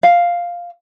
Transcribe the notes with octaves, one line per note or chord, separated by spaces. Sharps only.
F5